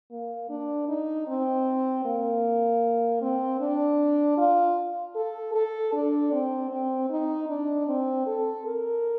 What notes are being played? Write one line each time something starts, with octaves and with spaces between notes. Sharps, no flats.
A#3
D4
D#4
C4
A#3
C4
D4
F4
A4
A4
D4
C4
C4
D#4
D4
C4
A4
A#4